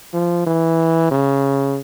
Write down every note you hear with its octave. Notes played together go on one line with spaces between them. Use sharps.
F3
E3
C#3